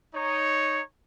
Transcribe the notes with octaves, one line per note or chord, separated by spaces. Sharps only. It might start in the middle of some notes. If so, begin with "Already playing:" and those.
D#4 C#5